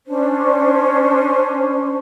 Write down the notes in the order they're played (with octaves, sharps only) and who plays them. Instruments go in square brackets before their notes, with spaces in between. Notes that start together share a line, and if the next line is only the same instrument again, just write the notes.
[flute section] C#4 D4 C5